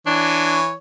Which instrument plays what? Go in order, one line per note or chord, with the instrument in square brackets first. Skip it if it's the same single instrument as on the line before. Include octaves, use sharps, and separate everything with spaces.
[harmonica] E3 C#5 [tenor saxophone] D4